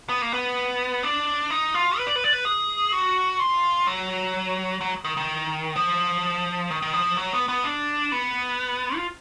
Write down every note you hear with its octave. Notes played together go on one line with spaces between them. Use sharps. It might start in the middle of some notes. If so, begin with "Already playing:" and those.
B3
A#3
B3
D4
D#4
F4
B4
D5
B4
D5
B4
G#4
F#4
F4
F#3
F#3
D#3
D#3
F3
D#3
D#3
F3
F#3
B3
B3
D4
B3
F4